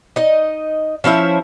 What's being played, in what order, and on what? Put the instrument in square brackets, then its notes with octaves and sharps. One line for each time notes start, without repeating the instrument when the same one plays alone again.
[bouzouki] D#4 D#5
F3 C#4 E4 E5